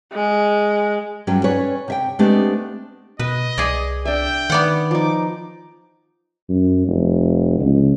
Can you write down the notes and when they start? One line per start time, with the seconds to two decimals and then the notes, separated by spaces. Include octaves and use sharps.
0.12 G#3
1.27 G2 F#3 C#4 F#4 G5
1.44 C#4 B4 C#5 D5
1.88 C3 E5 G5
2.19 G#3 A3 B3 C4 D4 G4
3.19 B2 B4 D#5
3.58 C2 G#4 D5
4.05 D4 E5 G5
4.50 D#3 B3 D5 F#5
4.91 F3 D#4 D6
6.49 F#2
6.88 F1
7.60 C#2